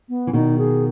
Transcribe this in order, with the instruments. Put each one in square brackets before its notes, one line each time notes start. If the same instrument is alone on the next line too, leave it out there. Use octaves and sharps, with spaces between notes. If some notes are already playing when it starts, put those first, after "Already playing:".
[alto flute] B3
[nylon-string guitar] E3
[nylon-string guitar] B2 D#3 [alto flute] D#4
[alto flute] G#4